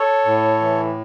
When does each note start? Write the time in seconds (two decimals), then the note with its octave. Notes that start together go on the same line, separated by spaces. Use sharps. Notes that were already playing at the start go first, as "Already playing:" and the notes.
Already playing: A4 C#5
0.25 A2
0.61 E3